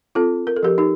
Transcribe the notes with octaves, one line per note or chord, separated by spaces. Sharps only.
C4 F4 A4
A#4
A4
F3 G4 A#4
D#4 G4